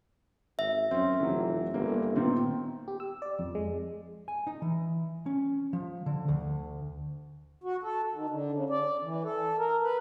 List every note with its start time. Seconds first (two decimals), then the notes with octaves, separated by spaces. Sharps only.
0.59 G#1 E5
0.91 F#2 C4 C#4
1.20 F1 E3 F#3
1.74 G1 A#3
2.16 A#2 D#3 B3 C4
2.88 G4
3.00 E6
3.22 D5
3.39 F2
3.55 G#3
4.28 G#5
4.47 D#4
4.62 E3
5.26 C#4
5.73 F3
6.06 D3
6.28 D2
7.64 F#4
7.83 A4
8.13 D#3
8.30 D3
8.52 C#3
8.70 D5
9.02 E3
9.23 A4
9.58 A#4
9.82 B4